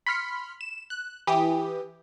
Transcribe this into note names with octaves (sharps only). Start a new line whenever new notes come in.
B5 C6 F6 B6 C#7
E7
F#6
E3 G4 D#6